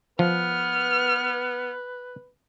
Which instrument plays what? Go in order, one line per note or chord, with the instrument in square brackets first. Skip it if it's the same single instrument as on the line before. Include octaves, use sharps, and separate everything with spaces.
[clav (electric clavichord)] F3 [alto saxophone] B3 [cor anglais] B4 [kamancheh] F6